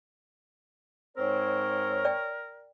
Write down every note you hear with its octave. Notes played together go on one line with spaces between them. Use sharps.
G#2 C4 A#4 C#5
D5 G5